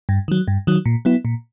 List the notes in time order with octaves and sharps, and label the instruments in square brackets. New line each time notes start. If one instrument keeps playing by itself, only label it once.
[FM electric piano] G2
D#3 F#3
G2
D#3 F#3
A#2
F#3 B3 E4
A#2